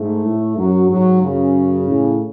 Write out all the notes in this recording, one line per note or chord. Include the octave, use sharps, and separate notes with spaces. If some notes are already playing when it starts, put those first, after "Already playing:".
Already playing: G#2 A3
A2
F#2 F#3
G#2 F#3
F#2 C#3
A2